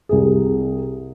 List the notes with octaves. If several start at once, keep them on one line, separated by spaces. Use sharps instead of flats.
C2 G#4